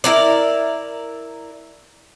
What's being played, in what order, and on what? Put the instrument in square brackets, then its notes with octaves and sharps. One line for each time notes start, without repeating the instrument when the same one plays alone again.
[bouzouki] E4 A#4 D5